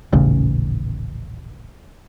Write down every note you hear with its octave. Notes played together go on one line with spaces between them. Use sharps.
D#1 A1 C#3